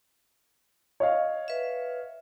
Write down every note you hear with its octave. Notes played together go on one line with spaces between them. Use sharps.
C#5 D#5 F5
B4 E5